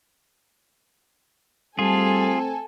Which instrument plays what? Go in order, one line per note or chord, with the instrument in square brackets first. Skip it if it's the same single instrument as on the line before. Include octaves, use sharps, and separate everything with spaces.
[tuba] G3 [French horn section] A3 C4 [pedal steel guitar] F4 G#4 [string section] A4 G#5